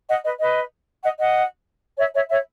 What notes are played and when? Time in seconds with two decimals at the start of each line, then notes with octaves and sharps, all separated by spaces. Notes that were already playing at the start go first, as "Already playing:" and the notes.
0.08 D#5 F#5
0.24 B4 D#5
0.40 B4 D#5
1.03 D#5 F#5
1.19 D#5 F#5
1.98 C#5 E5
2.14 C#5 E5
2.30 C#5 E5